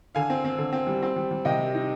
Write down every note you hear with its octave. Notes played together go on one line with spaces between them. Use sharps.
D3 F5 G#5
C4
C4
D3
C4
G3
C4
G3
G3
C3 D#5 G5
G3
D#4